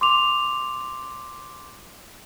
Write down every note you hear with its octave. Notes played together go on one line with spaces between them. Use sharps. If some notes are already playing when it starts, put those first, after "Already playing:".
C6 D6 F7